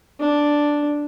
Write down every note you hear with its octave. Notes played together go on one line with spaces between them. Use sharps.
D4